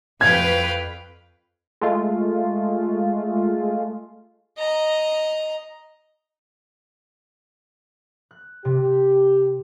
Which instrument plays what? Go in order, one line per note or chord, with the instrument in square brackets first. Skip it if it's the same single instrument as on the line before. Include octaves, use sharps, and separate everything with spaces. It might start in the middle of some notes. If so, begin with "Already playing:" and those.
[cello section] F2 B4 [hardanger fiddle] F5 G5 [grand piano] G#6
[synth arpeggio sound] G#3 A3 F4
[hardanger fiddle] D#5 A#5
[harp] F#6
[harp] C3 [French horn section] G4